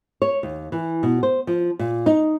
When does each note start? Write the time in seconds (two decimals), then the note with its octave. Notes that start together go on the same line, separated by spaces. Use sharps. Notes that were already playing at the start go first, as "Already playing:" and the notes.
0.22 C#5
0.43 D#2
0.72 E3
1.03 B2
1.23 C5
1.47 F3
1.79 A#2
2.06 D#4